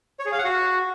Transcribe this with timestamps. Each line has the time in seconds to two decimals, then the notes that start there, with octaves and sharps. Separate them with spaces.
0.19 C#5
0.26 G#4
0.32 F5
0.38 F#5
0.45 F#4